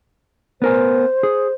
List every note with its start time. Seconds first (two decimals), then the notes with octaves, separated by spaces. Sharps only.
0.62 B3 A#4 C5 G#5
1.23 G#4